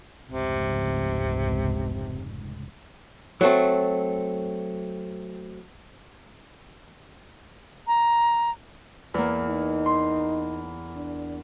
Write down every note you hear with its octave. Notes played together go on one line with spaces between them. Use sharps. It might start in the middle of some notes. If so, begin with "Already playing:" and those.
F1 C#2 G#2 C3
F#3 A3 C4
A#5
E2 A#3
D#4
C6
D4